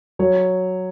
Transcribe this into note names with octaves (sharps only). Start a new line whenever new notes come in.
F#3 C#5